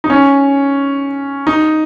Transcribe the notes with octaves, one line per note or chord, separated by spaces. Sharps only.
D#4
C#4
D#4